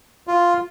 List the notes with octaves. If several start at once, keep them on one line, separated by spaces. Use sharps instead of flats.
F4